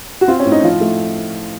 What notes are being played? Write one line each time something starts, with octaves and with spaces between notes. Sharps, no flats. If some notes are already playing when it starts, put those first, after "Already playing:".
F#4
C4 F4
C#4
A2
D#4
F3 F4
A3